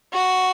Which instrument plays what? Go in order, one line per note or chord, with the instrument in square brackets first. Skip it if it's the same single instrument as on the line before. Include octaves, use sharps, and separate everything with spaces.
[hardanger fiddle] F#4